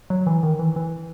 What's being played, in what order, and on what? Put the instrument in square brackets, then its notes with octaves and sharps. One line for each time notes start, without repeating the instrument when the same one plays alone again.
[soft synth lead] F#3
E3
D#3
E3
E3